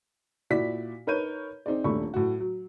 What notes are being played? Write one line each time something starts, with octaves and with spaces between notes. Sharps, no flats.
A#2 E4 F#4 D5 B6
D#4 A#4 B4 C#5 G6 D#7
C4 D#4 G#4 D5
D#1 A#2 A3 D4 B5 C#6
A2 F#3 F#4
F#3